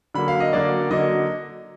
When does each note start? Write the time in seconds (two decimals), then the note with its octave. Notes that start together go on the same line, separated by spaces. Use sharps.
0.14 D3 F#3 A#3 B5
0.28 F5
0.40 D#5
0.53 D3 F#3 A#3 D5
0.91 D3 F#3 A#3 D#5